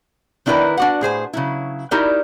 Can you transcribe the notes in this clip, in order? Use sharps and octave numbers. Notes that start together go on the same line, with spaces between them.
D#3 D4 E4 A#4 B4 G5
D4 F#4 F#5
A2 G#4 C5 G#5
C#3 F#3 E4
D#4 E4 F#4 G4 A#4 D5